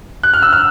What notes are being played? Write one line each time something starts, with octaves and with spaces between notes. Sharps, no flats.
F#6
F6
E6
F6